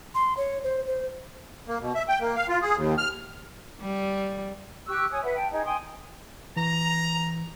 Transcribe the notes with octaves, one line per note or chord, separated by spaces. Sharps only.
C6
C#5
C5
C5
A#3
B2
E5
G5
A#3
F5
F4
G#4
D#2
F6
G3
G4 C#6 E6 F#6
C#5 G#5 D#6
B4 E5 F#5
G5 A5
D#4 G#4
G5 G#5 C6 D#6
E3 A#5